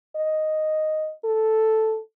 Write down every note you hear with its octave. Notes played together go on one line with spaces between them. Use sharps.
D#5
A4